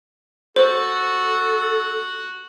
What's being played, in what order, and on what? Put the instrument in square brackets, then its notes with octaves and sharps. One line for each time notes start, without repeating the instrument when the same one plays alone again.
[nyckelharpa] F#4 [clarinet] A4 [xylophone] C5